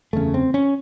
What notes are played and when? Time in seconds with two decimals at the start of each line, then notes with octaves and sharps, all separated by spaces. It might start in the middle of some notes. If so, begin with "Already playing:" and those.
0.13 F#1 E2 C#3 A3
0.34 C4
0.54 C#4